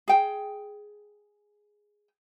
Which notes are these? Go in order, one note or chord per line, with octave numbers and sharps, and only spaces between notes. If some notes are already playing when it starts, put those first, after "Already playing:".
G#4 G5